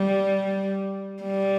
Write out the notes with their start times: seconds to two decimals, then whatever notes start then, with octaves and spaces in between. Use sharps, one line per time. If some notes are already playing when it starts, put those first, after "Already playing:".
Already playing: G3
1.23 G3